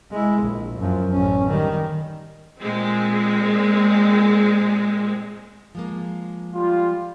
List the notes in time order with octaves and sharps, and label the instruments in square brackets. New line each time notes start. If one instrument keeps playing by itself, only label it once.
[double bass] G#3 E4
A#1
F#2 F3
A1 C#4
D#3 G3
[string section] A#2 G#3 C4
[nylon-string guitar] F3 G#3 A#3
[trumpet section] G3 F4